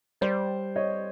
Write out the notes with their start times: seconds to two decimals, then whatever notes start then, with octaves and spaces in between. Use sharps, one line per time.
0.21 G3 C5 D5
0.76 C#5 D#5